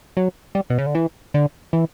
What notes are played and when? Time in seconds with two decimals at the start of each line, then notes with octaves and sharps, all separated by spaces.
0.17 F#3
0.55 G3
0.70 B2
0.78 C#3
0.86 D3
0.95 E3
1.34 D3
1.73 E3